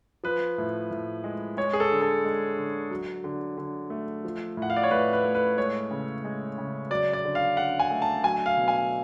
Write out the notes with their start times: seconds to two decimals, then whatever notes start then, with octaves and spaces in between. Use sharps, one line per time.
0.24 F3 B4
0.58 A2
0.91 A2
1.24 G#3
1.57 G#3 C#5
1.73 G#4
1.80 A4
1.91 D3
2.02 A4
2.25 G#3
2.57 D3
2.91 F#3
3.24 D3
3.58 D3
3.90 A3
4.25 F3
4.57 A2
4.62 F#5
4.70 F5
4.76 D5
4.83 C#5
4.91 A2 B4
5.13 B4
5.24 A3
5.35 B4
5.57 G#3 C#5
5.91 C#3
6.24 G#3
6.58 C#3
6.90 F#3 D5
7.13 D5
7.25 D3
7.35 F5
7.57 D3 F#5
7.79 G#5
7.91 A3
8.02 A5
8.24 F#3 G#5
8.46 F5
8.57 B2
8.68 G#5